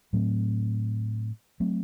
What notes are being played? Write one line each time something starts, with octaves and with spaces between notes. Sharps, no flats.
A2 F#3 A3 C4
F#3 A3 C4